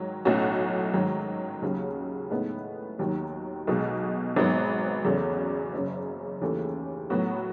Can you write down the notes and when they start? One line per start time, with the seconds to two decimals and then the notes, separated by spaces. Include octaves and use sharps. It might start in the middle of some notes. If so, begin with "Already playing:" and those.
Already playing: G#2 D#3 F#3
0.25 B1 A2 F#3 C#4 F#4
0.94 G#2 D#3 F#3
1.62 D#2 C#3 F#3
2.31 A2 G#3 B3 D#4
2.99 D#2 D#3 F#3
3.67 B1 B2 G#3
4.36 G#1 G#2 F#3 B3
5.05 E2 C#3 F#3 A3
5.73 F#1 F#2 C#3
6.41 D#2 C#3 E3 A3
7.10 A2 F#3 B3 F#4